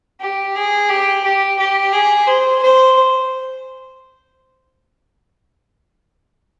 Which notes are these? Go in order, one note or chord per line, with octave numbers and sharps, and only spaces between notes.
G4
G#4
G4
G4
G4
G#4
C5
C5